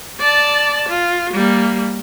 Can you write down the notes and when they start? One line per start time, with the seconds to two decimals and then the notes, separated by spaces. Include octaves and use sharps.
0.20 D5 A5
0.88 F4
1.33 G3 A#3